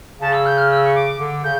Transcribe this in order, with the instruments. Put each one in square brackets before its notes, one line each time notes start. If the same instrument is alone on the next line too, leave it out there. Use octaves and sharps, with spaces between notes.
[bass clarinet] C#3 [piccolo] A5
[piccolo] E6
G6
F6
E6
C#6
D6
[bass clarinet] D3
[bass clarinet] C#3 [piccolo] G6